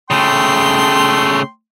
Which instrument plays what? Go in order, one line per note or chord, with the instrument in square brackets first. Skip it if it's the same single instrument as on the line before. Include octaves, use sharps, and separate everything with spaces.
[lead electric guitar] C#3 A3 [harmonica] G5 C6